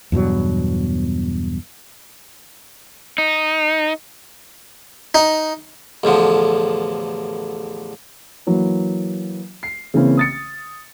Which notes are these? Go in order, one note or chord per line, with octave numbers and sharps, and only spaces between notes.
E2 G2 B2 F#3
D#4
D#4
A1 E2 D3 F3
E3 F#3 A#3
C7
C#3 E3 A#3 C4 C#4
D#6 A6 C#7